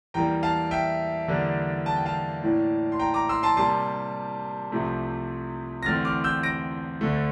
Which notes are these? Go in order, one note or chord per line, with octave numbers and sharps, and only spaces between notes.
E2 E3 G3 A#3 G5 A#5
F5 A5
E5 G5
E2 D3 G3 A#3 D4
A5
G5
F5 A5
A2 E3 A#3 D4
C6
G5 A#5
A#5 D6
C6 E6
A5 C6
C3 G3 A#3 A5 C6
C2 C3 F3 A3 C4
A#6
E2 D3 A3 C4 F6 A6
D6 F6
E6 G6
A#6 D7
D2 D3 A3